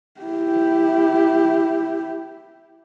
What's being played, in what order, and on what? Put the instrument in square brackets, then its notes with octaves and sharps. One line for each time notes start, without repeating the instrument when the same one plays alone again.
[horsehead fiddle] E4 G4